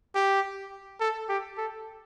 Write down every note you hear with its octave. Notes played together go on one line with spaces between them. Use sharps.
G4
A4
G4
A4